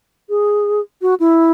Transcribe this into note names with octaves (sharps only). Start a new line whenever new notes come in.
G#4
F#4
E4